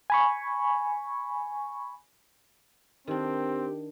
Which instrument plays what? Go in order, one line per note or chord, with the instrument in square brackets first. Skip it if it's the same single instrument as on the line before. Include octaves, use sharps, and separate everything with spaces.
[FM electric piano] G#5 B5 C#6
[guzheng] D#3 D4 [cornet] C4 [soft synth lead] G4